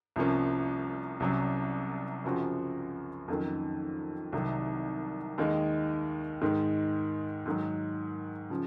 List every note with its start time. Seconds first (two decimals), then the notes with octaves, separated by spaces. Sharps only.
0.16 C2 C3 F3 A#3 C#4
1.20 C2 C3 F#3 C#4
2.24 F#2 C#3 F3 C4 F#4
3.28 F2 D#3 F#3 A#3 C#4
4.32 C2 C3 D#3 F#3
5.38 D#2 D#3 G#3
6.42 G#2 D#3 G#3
7.46 G#2 D#3 F#3
8.50 C#3 F3